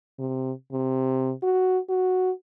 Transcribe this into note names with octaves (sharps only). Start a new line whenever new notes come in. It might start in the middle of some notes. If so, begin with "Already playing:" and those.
C3
C3
F#4
F#4